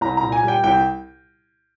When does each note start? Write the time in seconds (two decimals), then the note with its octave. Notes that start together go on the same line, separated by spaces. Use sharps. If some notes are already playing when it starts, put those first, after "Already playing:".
0.01 C2 A#5
0.17 A#2 A#5
0.32 G#5
0.43 G3 G5
0.63 C2 G5